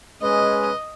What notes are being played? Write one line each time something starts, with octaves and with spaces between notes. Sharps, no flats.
G#3 C#4 B4 D#5